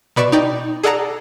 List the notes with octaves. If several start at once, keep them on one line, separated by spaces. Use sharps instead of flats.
B2 B4 D5 C#6 E7
D#4 D5 G5
G#4 A4 D5 F#5 A5 A#5